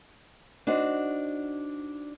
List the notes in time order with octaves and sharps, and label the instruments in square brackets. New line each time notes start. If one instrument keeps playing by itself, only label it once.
[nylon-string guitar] D4 D#4 F#4 C5